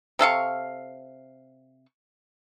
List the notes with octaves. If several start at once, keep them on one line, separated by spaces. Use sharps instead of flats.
C3 A4 F5 C#6